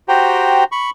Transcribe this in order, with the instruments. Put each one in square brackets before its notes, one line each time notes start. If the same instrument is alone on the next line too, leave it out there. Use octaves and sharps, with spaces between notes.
[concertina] F#4 G4 C5 G5 A#5
B5 C#6